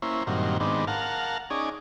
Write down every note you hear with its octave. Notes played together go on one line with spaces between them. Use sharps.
A#3 C#4 E4 C5
G2 A#2 D#3 F#3 C4
G#2 D#3 B3 C4 D4
A#4 F5 F#5 A5
C#4 D#4 G#4 D5